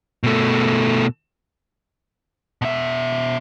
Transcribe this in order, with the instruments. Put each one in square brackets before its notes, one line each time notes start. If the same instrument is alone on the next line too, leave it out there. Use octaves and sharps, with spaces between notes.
[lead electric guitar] B2 A3
[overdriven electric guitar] B2 E5